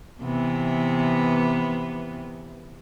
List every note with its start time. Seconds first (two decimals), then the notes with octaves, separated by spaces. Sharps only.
0.22 C3 E3 B3